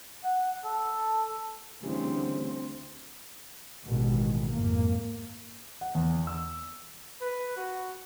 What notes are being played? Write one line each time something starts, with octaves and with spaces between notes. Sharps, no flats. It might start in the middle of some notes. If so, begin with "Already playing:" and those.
F#5
A4
D2 C#3 E3 G3 C4
A1 B2 D#3 G#3
F2 G#2 A#3
F#5
E2
E6
B4
F#4